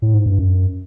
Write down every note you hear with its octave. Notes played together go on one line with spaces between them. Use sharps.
A2
G#2
G2
F#2